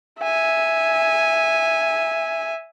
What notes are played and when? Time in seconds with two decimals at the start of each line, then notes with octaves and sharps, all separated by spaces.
0.20 E5 G#5